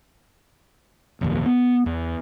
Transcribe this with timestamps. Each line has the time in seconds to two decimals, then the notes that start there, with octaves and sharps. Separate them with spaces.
1.21 F1 A#1 D#2
1.46 B3
1.86 E2